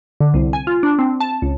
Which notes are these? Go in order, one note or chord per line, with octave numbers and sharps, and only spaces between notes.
D3
C2
G#5
F4
D4
C4
A5
C#2